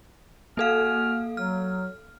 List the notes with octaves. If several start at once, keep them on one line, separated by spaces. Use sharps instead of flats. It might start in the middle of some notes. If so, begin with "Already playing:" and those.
A#3 F#4 A4 F5 G#5 F6
F#3 F6